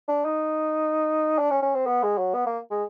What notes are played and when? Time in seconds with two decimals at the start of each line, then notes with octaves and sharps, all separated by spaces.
0.08 D4
0.25 D#4
1.38 D4
1.51 C#4
1.62 C#4
1.75 C4
1.87 B3
2.03 G#3
2.18 F#3
2.34 B3
2.46 A#3
2.71 G#3